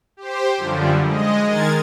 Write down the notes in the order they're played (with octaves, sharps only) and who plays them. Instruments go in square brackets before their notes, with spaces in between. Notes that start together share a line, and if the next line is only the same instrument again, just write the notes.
[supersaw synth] G4 C5
F#2 D3 F3 G3
G#3 D#5
D#3 G#3 A#4 G#6 A6